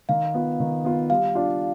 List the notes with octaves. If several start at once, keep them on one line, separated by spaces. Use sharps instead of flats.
D#3 F5
B3 F4
D#3
B3 F4
G3 F5
D4 F4